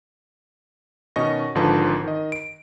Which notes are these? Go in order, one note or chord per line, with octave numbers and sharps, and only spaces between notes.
B2 D#3 C#4 D#5 C#6 A#6
G#1 G#2 D3 F3 B4 A5
D#3 D#5
D7